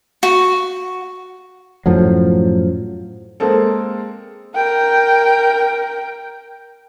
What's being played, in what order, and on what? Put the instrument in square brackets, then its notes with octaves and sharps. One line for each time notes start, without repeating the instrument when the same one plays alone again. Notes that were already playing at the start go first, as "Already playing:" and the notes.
[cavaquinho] F#4
[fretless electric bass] F#2 A2 F3 F#3
[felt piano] G#3 A#3 C4 A4
[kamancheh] A#4 G5